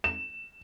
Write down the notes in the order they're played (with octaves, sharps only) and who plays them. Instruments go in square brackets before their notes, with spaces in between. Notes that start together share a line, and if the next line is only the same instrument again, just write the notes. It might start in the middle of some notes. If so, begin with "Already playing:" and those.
[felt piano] E7